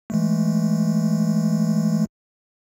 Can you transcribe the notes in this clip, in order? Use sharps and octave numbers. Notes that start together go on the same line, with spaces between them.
E3 G#3 A3